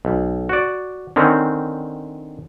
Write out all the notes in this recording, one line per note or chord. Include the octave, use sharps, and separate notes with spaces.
B1
F#4 D5
D3 D#3 C4 C#4